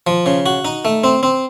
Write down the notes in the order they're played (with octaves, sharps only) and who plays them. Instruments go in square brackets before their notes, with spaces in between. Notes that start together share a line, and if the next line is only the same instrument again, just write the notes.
[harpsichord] F3
C#3
F#4
D#4
A3
C4
C4